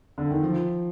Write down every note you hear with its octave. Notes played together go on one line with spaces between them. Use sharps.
D3
D#3
F3